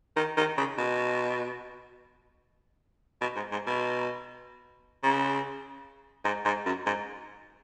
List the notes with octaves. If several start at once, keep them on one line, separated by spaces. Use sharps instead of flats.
D#3
D#3
C#3
B2
B2
G#2
G#2
B2
C#3
G#2
G#2
F#2
G#2